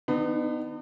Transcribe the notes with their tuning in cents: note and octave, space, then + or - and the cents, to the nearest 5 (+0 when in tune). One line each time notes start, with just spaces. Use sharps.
D#3 +25 B3 +25 D#4 -45